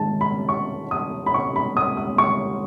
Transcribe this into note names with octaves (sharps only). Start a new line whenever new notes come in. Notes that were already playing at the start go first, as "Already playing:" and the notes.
Already playing: G#2 D#3 G#3 A5
B5
C#6
D#6
B5
C#6
B5
D#6
D#6
C#6